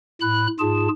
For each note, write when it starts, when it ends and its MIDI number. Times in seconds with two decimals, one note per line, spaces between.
0.21 0.47 45
0.21 0.47 83
0.21 0.47 90
0.59 0.88 44
0.59 0.88 65
0.59 0.88 68
0.59 0.88 81